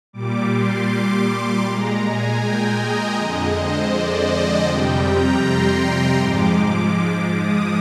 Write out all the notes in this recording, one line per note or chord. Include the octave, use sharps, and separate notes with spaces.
A#2 G3 D6
C6
D6
C6
A#2 G#3 A#5
G#5
G5
D#5
F2 D3 G#3
C5
D5
D#5
F2 C3 G3 G5
A#5
C6
G#2 F3 G#3 D6
D#6